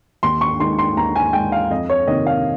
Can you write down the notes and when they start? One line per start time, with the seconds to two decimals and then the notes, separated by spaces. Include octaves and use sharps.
0.23 D#2 C6
0.41 C#6
0.60 D#3 G#3 C6
0.79 C6
0.97 D#2 A#5
1.16 G#5
1.33 D#3 G#3 G5
1.52 F5
1.70 F2 D#5
1.90 C#5
2.07 C3 D#3 A#3 D#5
2.27 F5